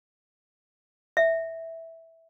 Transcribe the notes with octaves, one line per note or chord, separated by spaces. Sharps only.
E5